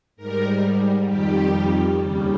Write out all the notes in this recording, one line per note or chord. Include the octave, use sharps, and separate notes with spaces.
G#2 G3 A#4
F2 D#3 G3 G4
D#2 C#3 G3